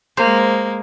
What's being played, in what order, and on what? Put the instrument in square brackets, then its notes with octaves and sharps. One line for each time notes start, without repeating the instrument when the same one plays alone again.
[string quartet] G#3 A#3 [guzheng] C5